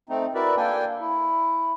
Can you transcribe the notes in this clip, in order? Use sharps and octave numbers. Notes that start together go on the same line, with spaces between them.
A3 C4 D#4
E4 F#4 A#4 B4 D5 E5
A#3 D4 A4 G5 G#5
E4